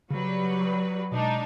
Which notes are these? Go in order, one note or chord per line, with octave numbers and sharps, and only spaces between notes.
C#3 F#3 G3 B4
B2 G#3 D4 D#4